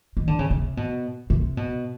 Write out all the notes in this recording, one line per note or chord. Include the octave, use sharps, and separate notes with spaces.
D#3
D3
C#3
C3
B2
C3
B2